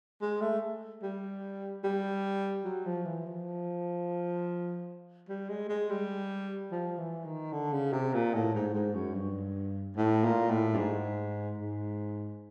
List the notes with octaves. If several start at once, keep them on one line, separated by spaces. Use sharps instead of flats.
G#3
A3
G3
G3
F#3
F3
E3
F3
G3
G#3
G#3
G3
F3
E3
D#3
D3
C#3
C3
A#2
A2
G#2
G#2
F#2
G2
A2
A#2
A2
G2
G#2
G#2